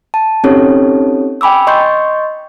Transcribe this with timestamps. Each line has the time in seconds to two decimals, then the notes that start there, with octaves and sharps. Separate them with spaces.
0.14 A5
0.44 C4 C#4 D#4 G4 A4 C#5
1.41 G5 G#5 B5 D6 E6
1.67 D#5 C6 C#6 G6